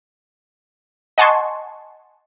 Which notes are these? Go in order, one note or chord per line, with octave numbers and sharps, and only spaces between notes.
D#5 F#5 G#5 A5 C6 C#6